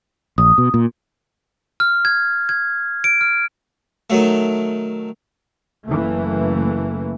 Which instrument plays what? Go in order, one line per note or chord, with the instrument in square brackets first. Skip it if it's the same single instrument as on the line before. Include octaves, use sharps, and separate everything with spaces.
[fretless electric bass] A#1 [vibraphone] D#6
[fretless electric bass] B2
A#2
[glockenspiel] F6
G#6
G#6
D7
F6
[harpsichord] D#3 F#3 A3
[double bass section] F#1 E3 A3 A#3